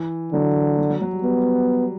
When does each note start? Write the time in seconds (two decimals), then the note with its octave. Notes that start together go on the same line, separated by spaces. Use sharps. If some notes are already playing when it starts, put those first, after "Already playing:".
Already playing: E3
0.33 D3 F#3
0.78 F#3
0.90 F#3
1.01 F#3
1.13 G3
1.23 G3 B3